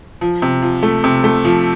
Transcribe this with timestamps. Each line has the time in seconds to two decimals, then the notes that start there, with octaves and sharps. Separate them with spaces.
0.21 F3
0.42 C3
0.62 F3
0.83 A3
1.04 C3
1.24 A3
1.45 F3